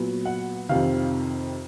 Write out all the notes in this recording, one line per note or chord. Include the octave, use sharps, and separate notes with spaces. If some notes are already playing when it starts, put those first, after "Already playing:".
Already playing: A#2 F#3 B3
F#5
F2 C3 D#3 F5